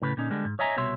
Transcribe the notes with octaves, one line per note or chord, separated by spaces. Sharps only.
A2 C#3 B4
A#2 D3 C#4 D#4
D3 G3 G#3 B3
G#2
C#5 D#5 E5 G#5 A#5
C2 B2 C#5 E5 C6